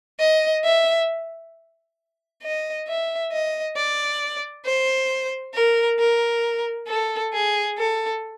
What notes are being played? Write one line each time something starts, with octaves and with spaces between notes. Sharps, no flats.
D#5
E5
D#5
E5
D#5
D5
C5
A#4
A#4
A4
G#4
A4